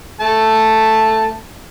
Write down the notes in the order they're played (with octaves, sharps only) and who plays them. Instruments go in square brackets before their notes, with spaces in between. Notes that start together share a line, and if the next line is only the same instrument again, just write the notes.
[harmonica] A3 A5